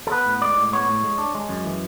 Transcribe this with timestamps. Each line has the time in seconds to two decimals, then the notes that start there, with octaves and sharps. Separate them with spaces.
0.07 A4
0.11 B3 B4
0.26 A2
0.42 G#3 D5
0.57 A2
0.73 B3 C#5
0.89 A2
1.03 G#3
1.18 D4
1.35 G#3
1.49 F#2
1.64 E3